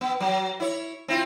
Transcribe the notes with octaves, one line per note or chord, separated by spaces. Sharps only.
B3
F#3
E4 C#5
C4 E4 F4